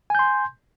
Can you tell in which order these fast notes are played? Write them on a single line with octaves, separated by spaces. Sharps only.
G#5 G6 C6